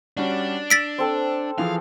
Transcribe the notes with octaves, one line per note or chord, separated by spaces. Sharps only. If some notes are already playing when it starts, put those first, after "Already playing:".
G3 C#4 D4 F#4
E6 A6 B6 D7
C4 A4 A5
E3 F3 G#4 F5